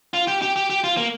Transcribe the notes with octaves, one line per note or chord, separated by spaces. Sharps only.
F4
G4
G4
G4
G4
F4
A#3